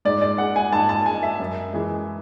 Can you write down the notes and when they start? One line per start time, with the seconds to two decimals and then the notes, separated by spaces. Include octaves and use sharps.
0.05 G#2 D5
0.22 D5
0.38 G#3 F#5
0.56 G#5
0.73 G#2 A5
0.89 A5
1.06 G#3 G#5
1.23 E5
1.40 F#2
1.73 E3 G#3